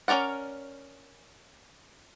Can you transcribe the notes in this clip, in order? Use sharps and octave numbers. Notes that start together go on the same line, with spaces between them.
C#4 D#4 A#4 D5 F#5